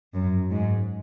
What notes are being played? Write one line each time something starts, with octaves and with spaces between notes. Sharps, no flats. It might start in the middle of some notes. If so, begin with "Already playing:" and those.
F#2
G#2